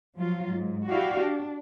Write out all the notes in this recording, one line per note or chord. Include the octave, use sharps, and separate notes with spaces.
F3 F#3 F4
G#2
E4 F#4 G4 D5 F5
D4